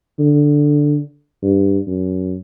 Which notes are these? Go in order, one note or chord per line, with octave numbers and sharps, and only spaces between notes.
D3
G2
F#2